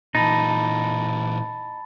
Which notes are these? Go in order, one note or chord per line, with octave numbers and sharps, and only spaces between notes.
A#2 E3 D#4 A5 B5 A6